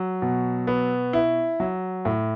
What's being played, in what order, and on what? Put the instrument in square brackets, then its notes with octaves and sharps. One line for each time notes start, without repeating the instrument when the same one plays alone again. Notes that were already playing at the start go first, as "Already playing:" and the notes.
Already playing: [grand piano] F#3
B2
B3
E4
F#3
A2